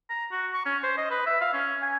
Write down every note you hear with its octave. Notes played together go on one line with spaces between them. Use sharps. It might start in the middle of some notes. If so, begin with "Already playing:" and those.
A#5
F#4
C#6
C#4
C5
D#5
B4
E5
F5
C#4
G#5